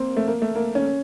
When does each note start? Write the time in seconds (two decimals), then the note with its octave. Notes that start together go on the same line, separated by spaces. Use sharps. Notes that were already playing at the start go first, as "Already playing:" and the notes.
Already playing: A#3 C4
0.16 A3
0.28 A#3
0.42 A3
0.56 A#3
0.75 C#4